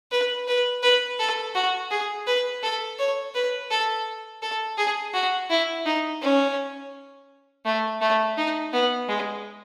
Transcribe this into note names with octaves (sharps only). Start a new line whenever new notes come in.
B4
B4
B4
A4
F#4
G#4
B4
A4
C#5
B4
A4
A4
G#4
F#4
E4
D#4
C#4
A3
A3
D#4
B3
G#3